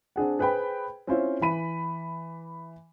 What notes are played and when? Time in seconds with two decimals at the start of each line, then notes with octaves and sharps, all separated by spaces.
0.16 C4 D4 G#4 F#5
0.39 G#4 B4 C5 G5 B5
1.07 C4 C#4 E4 F4 C5 C#5
1.41 E3 B5 D#7